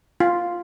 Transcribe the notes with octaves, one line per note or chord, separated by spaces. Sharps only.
F4